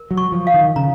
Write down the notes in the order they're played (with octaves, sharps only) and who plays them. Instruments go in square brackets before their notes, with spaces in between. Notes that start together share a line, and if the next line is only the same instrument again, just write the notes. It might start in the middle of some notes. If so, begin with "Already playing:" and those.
Already playing: [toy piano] A#4
[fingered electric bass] F#3
[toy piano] C#6
[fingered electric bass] F3
[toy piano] F5
[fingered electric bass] D#3
[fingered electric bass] C#3 [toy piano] A#5